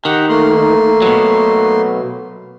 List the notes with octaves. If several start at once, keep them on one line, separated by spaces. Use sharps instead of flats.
D#3 G4 F#5
A3 A#3 C6
B2 F#3